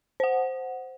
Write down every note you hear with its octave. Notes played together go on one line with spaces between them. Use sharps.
C5 F#5